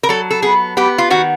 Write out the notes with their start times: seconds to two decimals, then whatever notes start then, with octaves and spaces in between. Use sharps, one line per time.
0.03 A#4
0.09 F#3 A4
0.30 A4
0.42 B3 G#4
0.77 B3 G4
0.98 F4
1.10 D#3 F#4